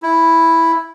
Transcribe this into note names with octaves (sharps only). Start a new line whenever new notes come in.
E4